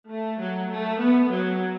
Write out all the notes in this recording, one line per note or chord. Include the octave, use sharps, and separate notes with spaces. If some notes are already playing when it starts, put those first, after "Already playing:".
A3
F#3
A3
B3
F#3